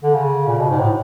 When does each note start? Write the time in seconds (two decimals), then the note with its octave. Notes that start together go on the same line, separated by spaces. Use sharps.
0.03 D3
0.14 C#3
0.47 A#2
0.58 B2
0.70 G#2
0.80 A2